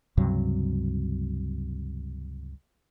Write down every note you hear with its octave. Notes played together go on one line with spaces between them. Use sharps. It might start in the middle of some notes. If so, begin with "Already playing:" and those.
C#2 G2 C3 F#3